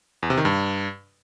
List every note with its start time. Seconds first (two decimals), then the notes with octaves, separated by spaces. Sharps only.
0.23 E2
0.30 C3
0.37 D#3
0.45 G2